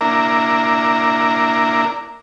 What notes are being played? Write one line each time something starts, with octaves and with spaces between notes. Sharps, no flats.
A#3 D4 E4 A#4